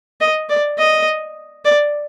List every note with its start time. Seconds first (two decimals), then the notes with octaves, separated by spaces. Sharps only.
0.21 D#5
0.50 D5
0.79 D#5
1.65 D5